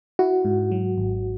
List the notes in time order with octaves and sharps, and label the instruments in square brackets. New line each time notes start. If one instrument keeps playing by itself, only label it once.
[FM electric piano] E4 [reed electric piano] F#4
[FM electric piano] G#2
F#3
G#1